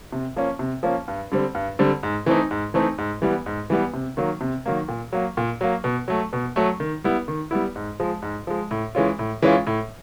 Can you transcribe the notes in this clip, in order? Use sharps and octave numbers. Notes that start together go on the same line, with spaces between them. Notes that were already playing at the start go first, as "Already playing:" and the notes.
C3
F3 A#3 C#4
C3
F3 A#3 C#4
G2
D3 G3 C4
G2
D3 G3 C4
G#2
E3 A3 C4 D#4
G#2
E3 A3 C4 D#4
G#2
E3 G3 B3
G#2
E3 G3 B3
C3
D#3 F#3 A#3
C3
D#3 F#3 A#3
A#2
F#3 A#3
A#2
F#3 A#3
B2
F#3 A3
B2
F#3 A3
D#3
G3 B3 E4
D#3
G3 B3 E4
G#2
F3 G#3
G#2
F3 G#3
A2
E3 G#3 C#4 F4
A2
E3 G#3 C#4 F4
A2